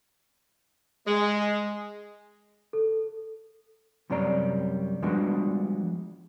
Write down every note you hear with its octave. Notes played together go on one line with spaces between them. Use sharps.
G#3
A4
F#2 C3 G3 C#5 D5 A#5
F3 G3 G#3 B3 D4 F#4